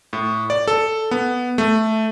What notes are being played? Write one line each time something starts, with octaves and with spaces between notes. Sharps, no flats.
A2
D5
A4
B3
A3